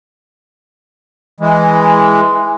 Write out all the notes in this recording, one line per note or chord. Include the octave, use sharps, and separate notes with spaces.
E3 G#3